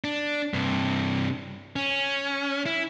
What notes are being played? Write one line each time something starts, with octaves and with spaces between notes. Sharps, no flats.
D4
G2 C3
C#4
E4